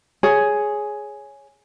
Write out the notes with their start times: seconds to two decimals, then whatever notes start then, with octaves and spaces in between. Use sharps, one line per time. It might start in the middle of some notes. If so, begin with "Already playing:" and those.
0.23 G#4 C#5